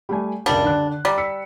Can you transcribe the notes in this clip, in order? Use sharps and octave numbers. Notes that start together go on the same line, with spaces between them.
G3 A3 G#5
F#1 C#2 G3 D4 A#4
D3 F#6
G3 A#5 D6
E6 B6 C#7